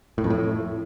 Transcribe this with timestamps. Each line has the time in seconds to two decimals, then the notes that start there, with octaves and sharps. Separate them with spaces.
0.18 A2
0.24 F2
0.30 A2